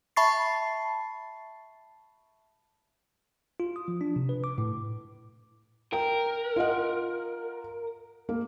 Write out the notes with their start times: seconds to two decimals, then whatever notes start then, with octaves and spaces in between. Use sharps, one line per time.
0.16 E5 A5 B5 C#6 A6 C7
3.60 F4
3.76 D#6
3.88 F3
4.01 D4
4.16 C3
4.29 B4
4.44 D6
4.58 A2
5.93 A#4 G5
6.56 F4 D#5 F#5
8.29 A#3